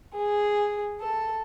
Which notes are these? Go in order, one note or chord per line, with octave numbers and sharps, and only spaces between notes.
G#4
A4